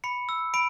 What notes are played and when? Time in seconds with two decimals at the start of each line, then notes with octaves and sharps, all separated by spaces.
0.04 B5 C#7
0.29 E6
0.54 B5 D7